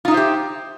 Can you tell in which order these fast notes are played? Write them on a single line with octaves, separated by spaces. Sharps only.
F4 D#4 E5 C5 G4